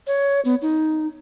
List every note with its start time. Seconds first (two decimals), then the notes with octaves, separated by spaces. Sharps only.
0.07 C#5
0.45 B3
0.62 D#4